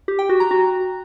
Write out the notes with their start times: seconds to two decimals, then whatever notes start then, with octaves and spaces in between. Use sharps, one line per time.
0.08 G4
0.19 G5
0.29 F#4
0.40 A#5
0.51 F#4